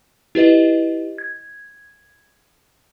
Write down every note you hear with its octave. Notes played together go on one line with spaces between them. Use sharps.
E4 G4 B4 D#5
G#6